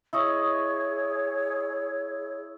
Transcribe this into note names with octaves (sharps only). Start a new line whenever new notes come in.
E4 G#4 C#5 D#5 C#6